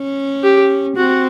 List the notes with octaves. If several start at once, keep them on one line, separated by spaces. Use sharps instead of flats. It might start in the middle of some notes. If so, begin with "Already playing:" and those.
Already playing: C#4
G4
C4 F#4